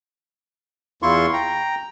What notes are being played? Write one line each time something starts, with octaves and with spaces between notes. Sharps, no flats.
E2 E4 F4 C6 C#6
G5 A#5